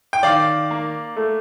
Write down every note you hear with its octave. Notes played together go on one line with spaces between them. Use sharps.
G5
D#3 D5 F5
A#3
A3